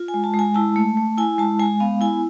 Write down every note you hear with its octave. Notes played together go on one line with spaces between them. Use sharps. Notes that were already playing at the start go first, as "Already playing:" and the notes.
Already playing: F4
G#5
G#3
A5
G#3
G#5
E4 A5
A3
A3
E4 G#5
G#3 A5
G#3 G#5
B3 F5
E4 G#5